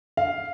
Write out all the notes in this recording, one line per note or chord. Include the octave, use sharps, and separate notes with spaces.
F5